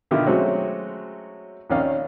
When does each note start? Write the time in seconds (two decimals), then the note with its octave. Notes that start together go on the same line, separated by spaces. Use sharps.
0.11 B2 D3 D#3 E4 F4 G4
0.26 F#3 G#3 A3 C4 C#4 F#4
1.70 A#1 D#2 D#3 C#4 D5 F5